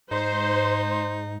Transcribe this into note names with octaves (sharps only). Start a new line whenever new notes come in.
G#2 D#4 C5